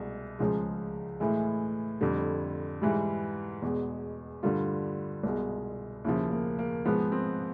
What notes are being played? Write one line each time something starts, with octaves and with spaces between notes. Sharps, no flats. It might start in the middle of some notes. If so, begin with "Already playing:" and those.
Already playing: C2 B2 G#3
C#2 C#3 F3 G#3
A2 E3 G#3
F2 D3 G3
G#2 E3 G3
E2 B2 G#3
G2 D3 G3 F4
C2 B2 G#3
D#2 C#3 F3 E4
A#3
A#3
G#2 F3 G#3 B3
C4